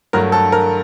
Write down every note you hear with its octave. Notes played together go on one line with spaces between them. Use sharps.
G2 F#3 A3 A#4
A4
A#4